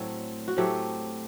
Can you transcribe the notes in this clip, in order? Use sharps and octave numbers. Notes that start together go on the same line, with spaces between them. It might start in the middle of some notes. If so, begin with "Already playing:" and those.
Already playing: A2 F#3 A3 C4
F#4
A2 F#3 A3 C4 G4